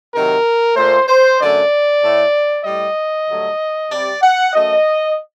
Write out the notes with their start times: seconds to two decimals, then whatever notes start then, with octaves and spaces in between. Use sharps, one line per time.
0.13 C3 D#3 F#3 A#4
0.76 A#2 A3 C5
1.09 C5
1.39 F#2 D3 A3 D5
2.02 A2 A3
2.65 A2 G3 D#5
3.28 G2 D3 F#3 A3
3.91 C3 G3 D5
4.22 F#5
4.54 F#2 F#3 A3 D#5